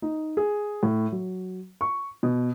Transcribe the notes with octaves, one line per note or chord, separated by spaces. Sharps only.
D#4
G#4
A2
F#3
C#6
B2